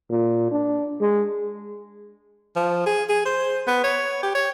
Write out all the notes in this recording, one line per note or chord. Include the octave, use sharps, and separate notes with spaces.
A#2
D4
G#3
F3
G#4
G#4
C5
B3
C#5
G4
C#5